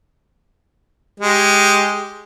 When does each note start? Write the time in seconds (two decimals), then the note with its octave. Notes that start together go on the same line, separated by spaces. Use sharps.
1.20 G#3 G4